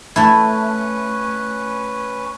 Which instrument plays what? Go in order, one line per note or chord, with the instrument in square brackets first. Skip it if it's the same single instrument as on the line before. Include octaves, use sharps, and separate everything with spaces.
[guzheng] A3 E4 [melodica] C#4 B4